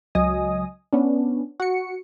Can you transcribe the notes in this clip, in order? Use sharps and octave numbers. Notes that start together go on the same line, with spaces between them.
C#2 F#3 D#5 G#5 D#6
B3 C#4 D4
F#4 C#7